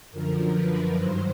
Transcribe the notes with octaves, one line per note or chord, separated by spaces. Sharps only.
F#2 D3 F3 A#4
B4
G2 D#3 F#3 C5